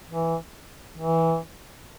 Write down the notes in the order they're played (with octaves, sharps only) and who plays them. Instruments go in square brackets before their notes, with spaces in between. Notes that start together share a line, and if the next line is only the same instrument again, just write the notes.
[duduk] E3
E3